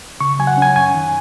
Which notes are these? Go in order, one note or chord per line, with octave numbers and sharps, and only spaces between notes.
C#3 C#6
F#3 G#5
F#5
C#4 G#5
F#2 G#5
D#3